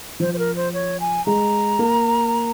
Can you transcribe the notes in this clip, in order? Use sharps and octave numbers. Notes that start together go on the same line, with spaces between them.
F3 C5
C5
A#4
C5
C#5
G#5
G#3 A#5
A#3